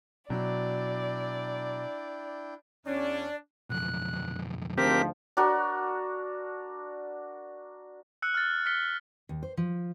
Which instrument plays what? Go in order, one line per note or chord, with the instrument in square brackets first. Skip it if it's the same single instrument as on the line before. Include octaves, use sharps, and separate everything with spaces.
[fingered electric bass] B2 [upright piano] F#3 [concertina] D4 E4 G5 [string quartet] D5
[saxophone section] E2 C#4 [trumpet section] D4 [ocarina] D5
[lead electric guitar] B1 F2 [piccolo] F#6
[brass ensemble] D2 G#2 F3 [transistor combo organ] C4 G4 A#4 [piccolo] B6
[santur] D4 F#4 A#4
[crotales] E6 F#6 C#7
F6 F#6 A6
E6 F6 B6 C#7 G7
[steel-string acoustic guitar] D#2
C5
F3